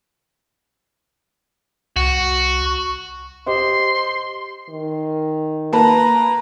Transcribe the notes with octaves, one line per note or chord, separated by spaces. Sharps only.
C2 F#4
G4 C5 D#5 C6
D#3
A#3 B4 A5 A#5